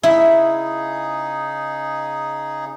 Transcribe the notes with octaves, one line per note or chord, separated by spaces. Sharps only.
C#3 D#4 E4 G#4